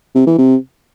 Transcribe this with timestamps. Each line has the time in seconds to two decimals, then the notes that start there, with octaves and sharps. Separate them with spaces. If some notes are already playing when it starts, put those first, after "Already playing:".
0.15 C3
0.27 E3
0.38 C3